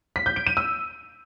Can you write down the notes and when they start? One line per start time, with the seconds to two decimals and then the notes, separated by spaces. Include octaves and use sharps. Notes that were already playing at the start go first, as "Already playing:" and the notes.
0.16 B6
0.26 G6
0.36 D7
0.47 D#7
0.57 E6